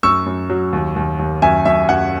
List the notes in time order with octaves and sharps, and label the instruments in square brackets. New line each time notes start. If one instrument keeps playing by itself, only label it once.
[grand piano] F#2 C#6 E6
F#2
F#3
D#2
D#2
D#2
F#2 E5 G#5
F#2 E5
F#2 F#5